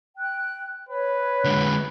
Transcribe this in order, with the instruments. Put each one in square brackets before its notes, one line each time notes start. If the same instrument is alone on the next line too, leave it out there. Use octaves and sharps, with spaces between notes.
[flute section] G5 F#6
[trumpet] B4 [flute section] C#5
[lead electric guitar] D3 G#3